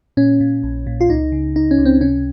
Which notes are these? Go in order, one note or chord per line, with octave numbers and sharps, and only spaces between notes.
A#2 C#4
A#2
A#1
A#2
F4
C#2 D#4
C#3
C#2 D#4
C#4
C#2
C4
C3 C#4